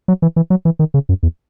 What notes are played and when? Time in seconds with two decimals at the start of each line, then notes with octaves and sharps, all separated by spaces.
0.08 F#3
0.22 E3
0.36 E3
0.50 F#3
0.65 E3
0.79 D#3
0.94 C#3
1.09 F#2
1.23 E2